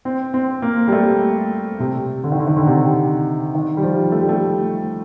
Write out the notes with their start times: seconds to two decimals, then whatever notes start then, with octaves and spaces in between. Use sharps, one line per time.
0.05 C4
0.34 C4
0.62 A#3
0.88 G3
0.92 A3
1.80 C3
2.24 D3
2.32 D#3
2.40 D3
2.47 D#3
2.56 D3
2.67 C3
3.55 D#3
3.77 G3
3.83 F3
4.12 A3
4.21 G3
4.29 A3